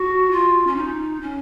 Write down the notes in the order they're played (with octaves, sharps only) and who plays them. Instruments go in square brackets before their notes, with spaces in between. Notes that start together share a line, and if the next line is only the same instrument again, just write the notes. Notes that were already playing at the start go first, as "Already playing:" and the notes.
Already playing: [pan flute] F#4
F4
C#4
D#4
C#4